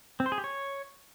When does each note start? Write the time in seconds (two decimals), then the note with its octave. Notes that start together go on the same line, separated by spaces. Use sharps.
0.20 C4
0.26 C5
0.32 G#4
0.38 G4
0.44 C#5